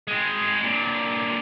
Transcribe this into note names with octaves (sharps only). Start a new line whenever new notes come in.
G#3 C4
A#2 D3